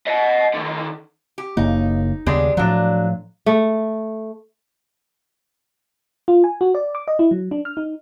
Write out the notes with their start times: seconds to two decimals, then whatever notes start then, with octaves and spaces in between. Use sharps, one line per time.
0.07 D#5 F#5
0.54 D3 D#3
1.38 G4
1.57 F#1 C#3 A#3 D#4
2.26 D#2 C#3 G3 G#3 B3 D4
2.57 A2 F3 F#3 D4
3.46 A3
6.28 F4
6.44 G#5
6.61 F#4
6.75 D5
6.95 D6
7.08 D#5
7.19 E4
7.31 F#3
7.51 D4
7.65 F6
7.77 D#4